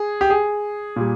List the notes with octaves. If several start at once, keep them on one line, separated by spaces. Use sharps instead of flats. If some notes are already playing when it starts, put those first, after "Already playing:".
Already playing: G#4
G4
G#4
A#2 G3